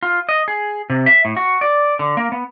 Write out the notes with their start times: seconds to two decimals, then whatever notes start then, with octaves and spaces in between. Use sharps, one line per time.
0.03 F4
0.29 D#5
0.48 G#4
0.90 C3
1.06 E5
1.25 A2
1.37 F#4
1.61 D5
1.99 D3
2.17 A#3
2.32 B3